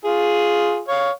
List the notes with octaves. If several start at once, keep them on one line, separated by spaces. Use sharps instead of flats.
F4 G#4
C#5 F5